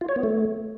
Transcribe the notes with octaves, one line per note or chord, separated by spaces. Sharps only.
F4
C#5
B3
A3